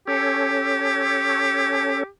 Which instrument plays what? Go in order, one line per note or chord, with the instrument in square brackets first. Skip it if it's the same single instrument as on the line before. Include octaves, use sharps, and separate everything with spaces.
[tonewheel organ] C#4 A4 C#5 [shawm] G4